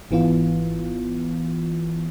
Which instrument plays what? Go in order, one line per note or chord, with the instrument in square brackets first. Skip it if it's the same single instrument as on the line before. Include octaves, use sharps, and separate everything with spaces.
[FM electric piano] G#1 E3 B3 F4